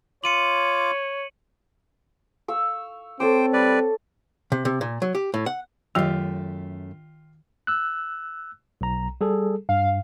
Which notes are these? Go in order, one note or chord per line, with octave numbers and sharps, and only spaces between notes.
F4 C#5 D6 C#7 D#7 F#7
F5 C#6 E6
C4 A4 C5 C#5 G5 D6
G3 B4 D5
C3
C3
A#2
F#3
G4
A2
F#5
F#2 D#3 A3 F4 G4 D#5
E6 F#6
B1 A#5
G3 G#4 A4
G2 F5